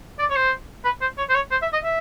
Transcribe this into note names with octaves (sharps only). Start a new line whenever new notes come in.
D5
C#5
C5
B4
C5
C#5
C5
C#5
C5
E5
D#5
E5